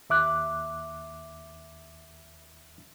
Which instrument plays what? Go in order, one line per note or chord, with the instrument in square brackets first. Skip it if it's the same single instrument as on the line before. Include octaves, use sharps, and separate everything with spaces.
[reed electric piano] D#2 E5 D6 F#6